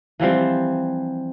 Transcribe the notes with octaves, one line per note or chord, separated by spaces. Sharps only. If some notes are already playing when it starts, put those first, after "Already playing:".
E3 F3 G3 C4